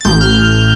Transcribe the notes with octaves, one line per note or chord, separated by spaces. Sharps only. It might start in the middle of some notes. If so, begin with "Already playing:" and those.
A6
A1 G6
F6